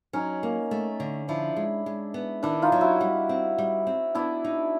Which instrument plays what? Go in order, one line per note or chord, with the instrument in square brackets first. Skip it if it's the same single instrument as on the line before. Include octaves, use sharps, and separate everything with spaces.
[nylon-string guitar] F#3 [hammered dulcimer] C#4 D#4
[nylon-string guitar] A#3
A3
D3
[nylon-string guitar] F3 [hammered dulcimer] D4 E4
[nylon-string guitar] G#3
G#3
B3
[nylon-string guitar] D#3 [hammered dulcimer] D4 E4
[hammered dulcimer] D#4 F4
[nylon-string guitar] F#3
[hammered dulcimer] E4 F#4
[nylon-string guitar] G3
C4
G3
C4
[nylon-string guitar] B3 [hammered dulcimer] D4 E4
[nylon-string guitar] D#4